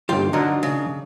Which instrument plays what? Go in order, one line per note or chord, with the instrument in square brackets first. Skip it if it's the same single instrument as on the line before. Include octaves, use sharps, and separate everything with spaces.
[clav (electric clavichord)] G1 D#2 [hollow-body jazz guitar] F4 G5
[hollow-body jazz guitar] D3 F#3 [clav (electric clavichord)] D4 D#4 A#4
[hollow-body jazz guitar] C#3